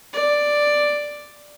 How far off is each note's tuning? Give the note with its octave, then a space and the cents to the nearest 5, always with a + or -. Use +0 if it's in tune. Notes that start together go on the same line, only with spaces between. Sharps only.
D5 +5